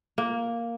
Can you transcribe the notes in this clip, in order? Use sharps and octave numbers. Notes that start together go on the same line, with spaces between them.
A#3